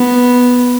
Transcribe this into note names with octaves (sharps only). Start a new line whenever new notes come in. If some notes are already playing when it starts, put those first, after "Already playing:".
Already playing: B3